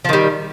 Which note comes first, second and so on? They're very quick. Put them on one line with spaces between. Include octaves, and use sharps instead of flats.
F3 D#3 G3